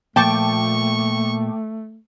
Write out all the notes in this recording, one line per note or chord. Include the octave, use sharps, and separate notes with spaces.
A#2 F3 A3 A#3 G5 A5 C#6 D6